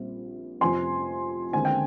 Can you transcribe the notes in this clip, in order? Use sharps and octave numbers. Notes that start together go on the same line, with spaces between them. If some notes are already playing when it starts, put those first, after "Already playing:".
Already playing: A#1 A#2 G3 C4
F1 F2 C3 F3 C4 G#5 C6
D#2 D3 G#3 C4 G#5
G5